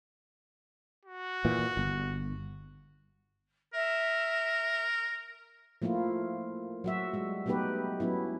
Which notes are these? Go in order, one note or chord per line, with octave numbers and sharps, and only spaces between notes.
F#4
A#2 E3
G1
A#4 E5
F3 A3 A#3 E4 F4
F#3 F#4 E5
G3 G#3
F#3 A3 B3 D#4 G4 B4
F#3 B3 C#4 E4